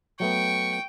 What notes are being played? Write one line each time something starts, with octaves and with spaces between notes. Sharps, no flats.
F#3 A3 B3 G5 C#6